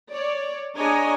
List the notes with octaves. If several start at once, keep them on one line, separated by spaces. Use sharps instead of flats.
C#5 D5
D4 G#4 C#5 D#5 G#5 A#5